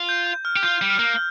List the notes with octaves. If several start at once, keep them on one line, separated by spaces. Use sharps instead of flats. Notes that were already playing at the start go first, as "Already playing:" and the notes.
Already playing: F4
G6
G6
F6
G4
F4 G6
G3
F6
A#3